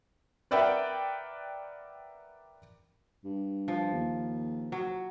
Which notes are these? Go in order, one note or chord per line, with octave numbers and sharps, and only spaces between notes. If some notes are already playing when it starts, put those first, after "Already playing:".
A#4 B4 D5 E5 F#5 G5
G2
F3
D#2
F#3